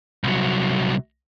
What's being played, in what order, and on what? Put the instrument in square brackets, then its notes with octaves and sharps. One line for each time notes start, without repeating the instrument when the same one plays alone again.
[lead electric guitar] C2 F#3